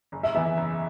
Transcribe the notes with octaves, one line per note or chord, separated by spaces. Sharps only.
F#1
E5
E2 E3 B3 E5
F#1